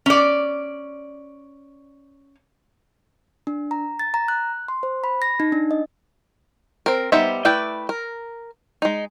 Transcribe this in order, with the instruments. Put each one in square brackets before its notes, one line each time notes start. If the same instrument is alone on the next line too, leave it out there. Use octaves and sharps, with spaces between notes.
[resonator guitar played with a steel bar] C#4 D5
[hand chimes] D4
A#5
A6
A#5
F#6
C6
C5
B5
A#6
D#4
D4
D#5
[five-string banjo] C4 A#4
G3 B3 D#4 C5 E5
A3 E4 B4 D5 G5
A#4
G#3 D#4